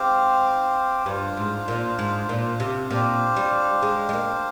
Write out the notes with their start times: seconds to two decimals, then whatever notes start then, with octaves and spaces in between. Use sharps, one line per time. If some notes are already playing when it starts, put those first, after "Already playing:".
Already playing: G#2 C4 G4 C5 F5
1.06 G2 D4 F4 C5 F5
1.37 G#2
1.68 A#2
1.99 G#2
2.29 A#2
2.60 C3
2.90 A#2 D4 G4 C5 F5
3.36 G3
3.82 G#3
4.09 G#3
4.13 A#3